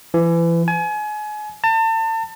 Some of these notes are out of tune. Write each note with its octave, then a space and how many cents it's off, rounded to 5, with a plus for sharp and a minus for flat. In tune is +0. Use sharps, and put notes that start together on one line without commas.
E3 +30
G#5 +30
A5 +35